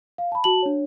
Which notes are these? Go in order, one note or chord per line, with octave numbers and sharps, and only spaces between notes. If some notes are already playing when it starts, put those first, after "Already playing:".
F5
A5 B5
F#4 A5 F#7
D4 C#5